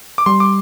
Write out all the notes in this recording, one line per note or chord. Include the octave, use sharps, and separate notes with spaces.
D6
G3 C6
D6